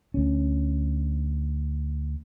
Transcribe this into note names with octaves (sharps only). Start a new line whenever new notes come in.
D2 C#4